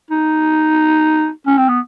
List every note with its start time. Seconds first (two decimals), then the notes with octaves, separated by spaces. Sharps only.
0.11 D#4
1.47 C#4
1.58 C4
1.69 B3